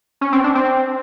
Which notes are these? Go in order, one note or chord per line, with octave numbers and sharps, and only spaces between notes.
C#4
C4
D4
C4